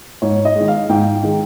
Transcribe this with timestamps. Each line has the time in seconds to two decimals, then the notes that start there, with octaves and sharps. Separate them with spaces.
0.22 G#2 C#5
0.45 D#5
0.56 D#3 G#3
0.68 F5
0.89 G#2 G5
1.23 D#3 G#3